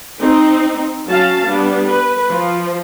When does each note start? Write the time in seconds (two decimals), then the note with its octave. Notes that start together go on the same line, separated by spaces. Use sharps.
0.21 C4 D#4
1.07 F#3 C#4 F5 A5
1.45 G3 B3 D4
1.89 B4
2.29 F3